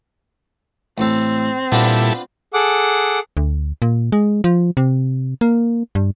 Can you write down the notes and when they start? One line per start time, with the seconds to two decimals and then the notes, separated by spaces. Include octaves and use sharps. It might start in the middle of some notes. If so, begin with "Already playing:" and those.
0.98 A1 C4 A4
1.72 A#2 G3 B3 D4 E4 F4 A4
2.54 G#4 A4 F#5 D6
3.37 D2
3.82 A#2
4.12 G#3
4.44 F3
4.77 C3
5.41 A#3
5.95 G2